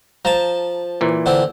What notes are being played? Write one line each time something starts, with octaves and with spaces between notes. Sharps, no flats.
F3 A5 A#5
A#2 E3
D3 C4